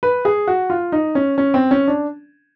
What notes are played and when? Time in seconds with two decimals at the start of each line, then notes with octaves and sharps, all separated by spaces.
0.03 B4
0.25 G#4
0.47 F#4
0.70 F4
0.92 D#4
1.15 C#4
1.38 C#4
1.54 C4
1.71 C#4
1.88 D4